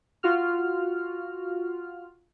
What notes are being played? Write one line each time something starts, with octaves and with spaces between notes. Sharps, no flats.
F4 F#4 F6